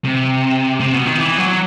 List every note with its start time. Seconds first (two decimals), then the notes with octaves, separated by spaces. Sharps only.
0.04 C3
0.80 C3
0.93 B2
1.06 D#3
1.18 E3
1.38 F#3